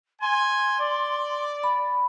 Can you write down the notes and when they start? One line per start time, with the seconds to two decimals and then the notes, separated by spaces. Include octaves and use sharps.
0.21 G#5 C6
0.79 D5
1.64 B5